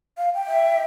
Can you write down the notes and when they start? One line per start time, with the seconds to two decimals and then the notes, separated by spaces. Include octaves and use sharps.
0.17 F5
0.35 G5
0.47 E5